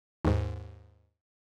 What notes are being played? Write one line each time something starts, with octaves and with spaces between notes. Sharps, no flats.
D#2 G#2